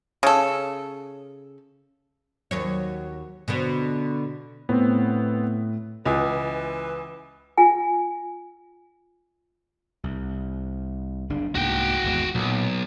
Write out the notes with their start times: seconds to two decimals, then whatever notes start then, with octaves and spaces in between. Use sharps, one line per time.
0.23 C#3 A4
2.51 D#2 F#3 C#5
3.48 B2 D3 B3
4.69 A2 B3 C4
6.05 C#2 E3
7.58 F4 G#5
10.04 C2
11.30 F#1 C#3 D4
11.55 C2 G#2 A#3 F#4 G5
12.04 G#1 E2 G#3
12.35 B1 A#2